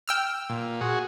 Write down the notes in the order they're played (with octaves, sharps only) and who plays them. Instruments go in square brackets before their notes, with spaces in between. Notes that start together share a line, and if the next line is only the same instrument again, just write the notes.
[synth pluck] G5 E6 F6
[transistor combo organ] A#2
F#4 G#4